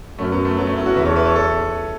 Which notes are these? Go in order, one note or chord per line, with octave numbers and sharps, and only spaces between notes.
F#2 A3 C#4
F#3 B3
A3
F#3 B3
A3 C#4
B3 E4
C#4 F#4
E2 B4 E5
A4 C#5
B4 E5
A4 C#5
A4 C#5